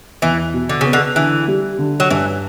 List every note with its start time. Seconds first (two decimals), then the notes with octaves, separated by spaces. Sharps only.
0.22 E2 E3
0.54 B2
0.69 D3
0.81 C#3 B3
0.93 D3
1.16 D3 E3
1.48 G3
1.79 D3
2.00 F#3
2.10 G2 E3